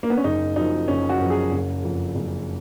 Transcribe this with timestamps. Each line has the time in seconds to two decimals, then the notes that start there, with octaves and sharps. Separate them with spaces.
0.03 A#3
0.10 B3
0.17 C#4
0.24 F#1 D#4
0.56 F#2 F3 D#4
0.88 F#1 C#4
1.09 F#4
1.19 F#2 F3
1.30 G#4
1.51 F#1
1.83 F2 F3
2.15 F#1